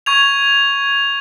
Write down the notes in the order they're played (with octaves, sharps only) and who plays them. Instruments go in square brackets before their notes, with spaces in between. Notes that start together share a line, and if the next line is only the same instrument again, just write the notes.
[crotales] C#6 G#6 F7